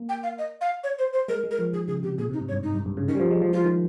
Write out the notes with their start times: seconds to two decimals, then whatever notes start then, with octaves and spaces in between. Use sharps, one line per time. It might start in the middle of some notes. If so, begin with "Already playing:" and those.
Already playing: A#3
0.09 G5
0.23 F5
0.38 D#5
0.61 F5
0.84 C#5
0.99 C5
1.13 C5
1.28 G#3 A#4
1.44 G#3
1.51 A#4
1.59 F3
1.73 D#3 G#4
1.88 C#3 G#4
2.03 C3 G4
2.18 A#2 G#4
2.30 C3
2.33 D#4
2.41 G#2
2.49 C#5
2.52 G2
2.63 D#4
2.74 G2
2.86 G2
2.97 C#3
3.08 D#3 C#4
3.15 G3
3.20 F3
3.31 G#3
3.42 F3
3.53 F3 F4
3.64 D#3